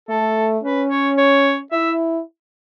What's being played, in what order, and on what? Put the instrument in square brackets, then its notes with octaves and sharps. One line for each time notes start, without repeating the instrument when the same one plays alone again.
[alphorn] A3 [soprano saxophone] A4
[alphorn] C#4 [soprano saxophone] B4
[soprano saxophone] C#5
C#5
[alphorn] E4 [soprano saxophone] E5